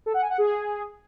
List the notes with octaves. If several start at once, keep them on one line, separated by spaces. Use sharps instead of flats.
A4
F#5
G#5
F#5
G#4